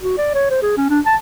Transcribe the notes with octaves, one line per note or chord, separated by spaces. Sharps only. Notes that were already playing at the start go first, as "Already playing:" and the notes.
F#4
D5
C#5
C5
G#4
C#4
D4
A5